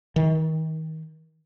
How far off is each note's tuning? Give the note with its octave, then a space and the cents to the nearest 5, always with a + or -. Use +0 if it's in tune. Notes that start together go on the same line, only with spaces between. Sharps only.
D#3 +35